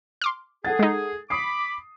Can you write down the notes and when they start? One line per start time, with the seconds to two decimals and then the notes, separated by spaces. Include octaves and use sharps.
0.22 C6 D6 F6
0.65 G#4 A4 F#5 A6
0.79 G#3 D#4
1.30 B5 D6 D#6 C7